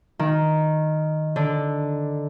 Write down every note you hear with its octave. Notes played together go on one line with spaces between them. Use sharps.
D#3
D3